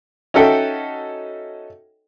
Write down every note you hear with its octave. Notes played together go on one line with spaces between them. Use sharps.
C#4 D#4 F#4 A4 E5 G5